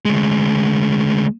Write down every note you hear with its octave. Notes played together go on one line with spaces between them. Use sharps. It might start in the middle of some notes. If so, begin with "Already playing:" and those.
D2 G#3